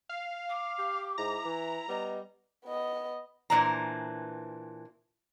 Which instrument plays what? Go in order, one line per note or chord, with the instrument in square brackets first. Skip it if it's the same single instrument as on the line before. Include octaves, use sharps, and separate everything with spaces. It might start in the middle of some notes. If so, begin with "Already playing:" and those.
[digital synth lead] F5
[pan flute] D6
[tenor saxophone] G4
[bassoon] G#2 [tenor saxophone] E4 [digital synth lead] A#5
[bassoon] E3
[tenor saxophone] G3 [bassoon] B3 [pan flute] D#5
[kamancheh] B3 D#5
[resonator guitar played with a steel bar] A#2 E3 D4 C5 A#5